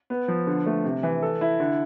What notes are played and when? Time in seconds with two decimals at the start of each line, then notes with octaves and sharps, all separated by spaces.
0.10 B3
0.28 F3
0.47 D3
0.66 A3
0.84 C3
1.03 E3
1.22 A4
1.41 E4
1.60 D3